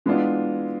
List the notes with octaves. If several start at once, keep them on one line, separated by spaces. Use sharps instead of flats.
E3 G#3 B3 D4 F4